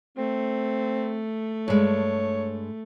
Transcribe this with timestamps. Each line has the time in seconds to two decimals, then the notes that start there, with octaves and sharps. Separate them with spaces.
0.17 A3 C4
1.68 G2 G#3 C#5